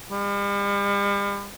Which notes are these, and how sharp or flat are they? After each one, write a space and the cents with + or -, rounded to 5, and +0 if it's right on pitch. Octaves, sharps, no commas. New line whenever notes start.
G3 +45